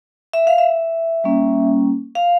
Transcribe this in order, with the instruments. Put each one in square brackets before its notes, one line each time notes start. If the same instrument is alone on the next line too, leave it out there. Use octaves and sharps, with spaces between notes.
[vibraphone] E5
F5
E5
G3 A#3 C#4
F5